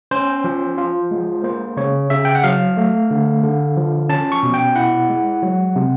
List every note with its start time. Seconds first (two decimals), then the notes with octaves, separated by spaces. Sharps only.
0.11 C#4 C5
0.44 F3
0.78 F4
1.11 G#3
1.44 A#3 C5
1.77 C#3 C#5
2.10 C#3 E5
2.25 G5
2.35 F#5
2.44 F#3 F5
2.77 A3
3.11 D3
3.43 D3
3.77 F3
4.09 C#4 A5
4.32 C#6
4.43 B2
4.54 G5
4.76 E4 F#5
5.09 G#3
5.43 F#3
5.76 C3